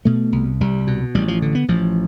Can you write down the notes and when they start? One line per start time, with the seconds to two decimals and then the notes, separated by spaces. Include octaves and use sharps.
0.05 B2 A3
0.32 C2
0.61 C2 G3
0.87 B2
1.15 A1 G3
1.28 F3
1.42 D3
1.55 B3
1.68 A1 F3